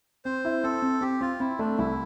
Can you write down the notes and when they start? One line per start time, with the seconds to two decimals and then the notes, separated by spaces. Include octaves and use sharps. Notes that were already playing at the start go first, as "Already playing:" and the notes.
0.25 C4 C5
0.45 E4
0.63 C4 A4
0.82 C4
1.01 C4 G4
1.21 C4 F4
1.40 C4 E4
1.59 A3 D4
1.78 C2 E4